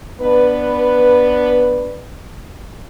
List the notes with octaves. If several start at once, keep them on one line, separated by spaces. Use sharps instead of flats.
B3 D4 B4